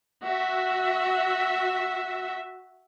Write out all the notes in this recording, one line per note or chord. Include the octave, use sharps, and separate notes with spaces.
F#4 E5